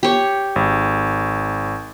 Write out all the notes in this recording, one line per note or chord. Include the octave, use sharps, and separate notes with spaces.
G4 C#5
G#1